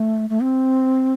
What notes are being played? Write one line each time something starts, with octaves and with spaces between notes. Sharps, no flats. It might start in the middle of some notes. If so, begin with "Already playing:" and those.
Already playing: A3
A3
C4